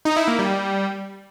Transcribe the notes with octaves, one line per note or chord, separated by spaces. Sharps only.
D#4
E4
A#3
G3